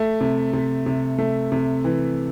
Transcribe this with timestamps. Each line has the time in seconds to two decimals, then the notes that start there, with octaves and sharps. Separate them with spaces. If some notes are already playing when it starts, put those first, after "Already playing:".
Already playing: A3
0.21 C3
0.53 C3
0.86 C3
1.18 A3
1.52 C3
1.84 E3